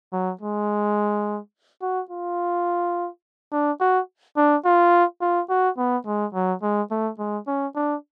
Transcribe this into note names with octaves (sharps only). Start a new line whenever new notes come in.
F#3
G#3
F#4
F4
D4
F#4
D4
F4
F4
F#4
B3
G#3
F#3
G#3
A3
G#3
C#4
D4